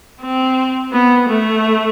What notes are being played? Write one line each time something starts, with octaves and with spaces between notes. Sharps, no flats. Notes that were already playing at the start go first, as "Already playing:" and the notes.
C4
B3
A3